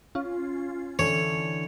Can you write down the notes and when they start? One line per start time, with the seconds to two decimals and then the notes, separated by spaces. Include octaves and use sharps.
0.15 C#4 F4
0.99 D3 E3 D4 C#5